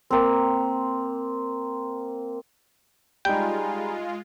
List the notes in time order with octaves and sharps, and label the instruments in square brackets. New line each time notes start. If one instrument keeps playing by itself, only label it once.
[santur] A#3 C4
[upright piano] G3 D#4 [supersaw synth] G#3 F4 [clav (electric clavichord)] G5 [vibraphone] G#5 A#5 B5